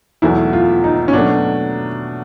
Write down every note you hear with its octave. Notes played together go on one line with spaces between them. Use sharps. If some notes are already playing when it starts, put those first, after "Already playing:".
E2 B2 F#3 A3 E4
F4
D#4
C#4
B2 F#3 A3 D4